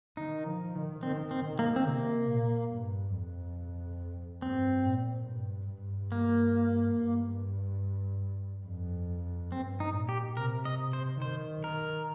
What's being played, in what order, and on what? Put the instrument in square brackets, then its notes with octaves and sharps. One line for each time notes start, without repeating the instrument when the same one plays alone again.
[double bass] D#3 [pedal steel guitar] D#4
[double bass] F3
D#3
[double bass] D#3 [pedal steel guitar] C4
[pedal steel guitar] C4
[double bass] D#3
[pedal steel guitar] A#3
C4
[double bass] C3 [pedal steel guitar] A#3
[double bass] A#2
G2
F2
[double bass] G2 [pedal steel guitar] C4
[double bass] A#2
G2
G2
[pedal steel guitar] A#3
[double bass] G2
F2
[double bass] G2 [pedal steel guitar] C4
[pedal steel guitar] D#4
[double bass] A#2
[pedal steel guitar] G4
[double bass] C3 [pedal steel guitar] A#4
[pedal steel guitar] D#5
C5
[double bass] D#3 [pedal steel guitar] C5
[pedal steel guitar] A#4